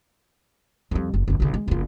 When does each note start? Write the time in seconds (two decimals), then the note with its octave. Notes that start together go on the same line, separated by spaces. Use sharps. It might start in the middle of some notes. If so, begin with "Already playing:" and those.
0.91 F2 G3
1.14 F#1
1.28 F#1 B1
1.40 B1 C#3
1.54 G#3
1.68 F#1 F4